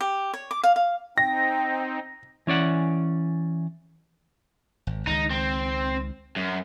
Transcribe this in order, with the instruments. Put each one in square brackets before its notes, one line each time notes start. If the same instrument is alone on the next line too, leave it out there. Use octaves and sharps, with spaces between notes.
[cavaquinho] G4
C#5
D6
F5
F5
[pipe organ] C4 D#4 [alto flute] G5 [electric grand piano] A#6
[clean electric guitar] E3 C#4 D5 F#5
[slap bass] G#1
[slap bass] C#2 D#3 G#3 [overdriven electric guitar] D#4
[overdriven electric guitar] C4
F#2